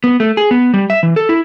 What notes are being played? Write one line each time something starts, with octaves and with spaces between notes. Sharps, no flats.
B3
A3
G#4
B3
G3
E5
E3
A4
E4